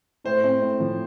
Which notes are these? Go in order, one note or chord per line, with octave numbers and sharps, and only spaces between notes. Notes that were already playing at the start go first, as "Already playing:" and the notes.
A2 C5
C4
A2
F3